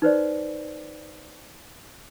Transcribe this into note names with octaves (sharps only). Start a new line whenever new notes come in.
D#4 B4 C5 D5